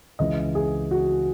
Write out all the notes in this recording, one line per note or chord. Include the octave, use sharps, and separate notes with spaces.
C#2 C#3 E3 D#5
G#4
F#4